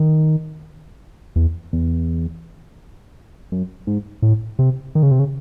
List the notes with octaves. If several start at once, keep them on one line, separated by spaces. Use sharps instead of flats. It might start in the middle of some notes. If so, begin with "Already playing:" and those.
Already playing: D#3
E2
E2
F#2
G#2
A2
C3
D#3
C#3
C3
C#3